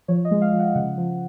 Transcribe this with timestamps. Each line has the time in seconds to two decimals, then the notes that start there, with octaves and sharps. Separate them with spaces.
0.08 F3 C#5
0.25 D#5
0.31 G#3
0.42 F5
0.53 F3
0.59 F#5
0.75 C#3 F#5
0.98 F3